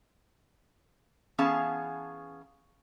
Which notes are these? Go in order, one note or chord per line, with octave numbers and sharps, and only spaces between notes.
E3 B3 C#4 G#4 F5 A5